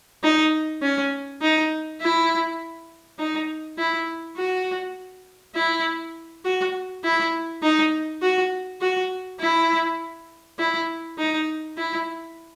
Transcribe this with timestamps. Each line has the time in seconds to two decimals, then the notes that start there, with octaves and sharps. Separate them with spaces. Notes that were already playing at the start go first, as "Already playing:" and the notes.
0.23 D#4
0.82 C#4
1.42 D#4
2.01 E4
3.19 D#4
3.78 E4
4.37 F#4
5.56 E4
6.45 F#4
7.04 E4
7.63 D#4
8.22 F#4
8.81 F#4
9.40 E4
10.59 E4
11.18 D#4
11.77 E4